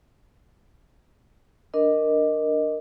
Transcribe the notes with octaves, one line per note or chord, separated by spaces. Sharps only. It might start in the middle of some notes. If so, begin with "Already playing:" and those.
D4 A#4 D#5